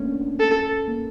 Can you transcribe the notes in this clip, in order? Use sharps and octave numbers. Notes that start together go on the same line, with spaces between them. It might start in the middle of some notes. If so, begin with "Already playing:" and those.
Already playing: A3 A#3 C#4 D4
A4
A#3